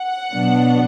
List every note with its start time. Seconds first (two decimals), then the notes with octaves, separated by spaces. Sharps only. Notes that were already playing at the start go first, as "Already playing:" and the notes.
Already playing: F#5
0.32 B2 F#3 B3 D4